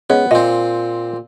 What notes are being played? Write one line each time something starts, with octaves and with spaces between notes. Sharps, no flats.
G#3 B3 C#4
A#2 C4 D#5